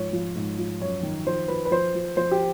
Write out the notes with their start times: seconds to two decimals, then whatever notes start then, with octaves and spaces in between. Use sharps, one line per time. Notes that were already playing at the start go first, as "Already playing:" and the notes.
Already playing: G#2 F3 C#5
0.13 F3
0.36 G#2
0.58 F3
0.82 F#2 C#5
1.03 D#3
1.26 F3 C5
1.48 F3 B4
1.65 B4
1.71 F3 C5
1.95 F3
2.17 F3 C5
2.31 G4